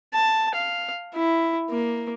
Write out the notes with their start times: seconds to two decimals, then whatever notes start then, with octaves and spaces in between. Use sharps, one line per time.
0.14 A5
0.54 F5
1.15 E4
1.70 A#3